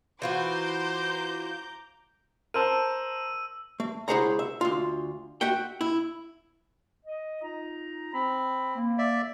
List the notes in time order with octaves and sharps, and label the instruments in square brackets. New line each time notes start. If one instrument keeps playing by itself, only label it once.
[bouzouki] E3 F4 F#4 [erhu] C5 [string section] A#5 D6 G6
[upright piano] A#4 C5 A5 [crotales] E6 D#7
[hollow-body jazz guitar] A3
C#2 E4 G#4 C5 F#5 A#5
E5
D2 F4
F#4 E5 F#5 G5
E4
[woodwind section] D#5
D#4 F4 A#5
[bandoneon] C4 [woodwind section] B5
[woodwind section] A#3
[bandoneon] D5 E5